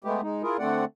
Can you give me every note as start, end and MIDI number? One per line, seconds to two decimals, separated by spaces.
0.04 0.21 56
0.04 0.21 57
0.04 0.21 59
0.04 0.21 67
0.23 0.42 56
0.23 0.42 63
0.43 0.57 64
0.43 0.57 65
0.43 0.57 68
0.43 0.57 70
0.59 0.85 50
0.59 0.85 57
0.59 0.85 60
0.59 0.85 74
0.59 0.85 78